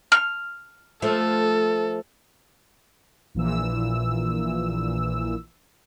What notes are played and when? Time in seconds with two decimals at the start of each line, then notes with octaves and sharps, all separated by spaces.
0.12 F6
1.02 F3 A3 A4
3.34 A#1 A#2 E3 E6